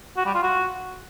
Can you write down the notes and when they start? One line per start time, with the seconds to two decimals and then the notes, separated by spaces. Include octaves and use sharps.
0.17 F#4
0.25 G3
0.34 F4
0.43 F#4